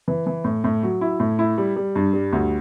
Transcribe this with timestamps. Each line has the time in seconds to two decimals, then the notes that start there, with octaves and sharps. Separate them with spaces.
0.08 E3
0.27 E3
0.44 A2
0.64 A2
0.83 F#3
1.01 E4
1.20 A2
1.39 E4
1.58 G3
1.76 G3
1.96 G2
2.13 G3
2.33 D2